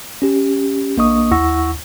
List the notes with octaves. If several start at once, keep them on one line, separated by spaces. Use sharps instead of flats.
C#4 G4
A#1 A#3 D4 D#5 C#6 D#6
D#2 E4 F#5 C#6 E6 A#6